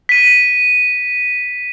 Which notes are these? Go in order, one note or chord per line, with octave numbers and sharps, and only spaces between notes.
B6 D#7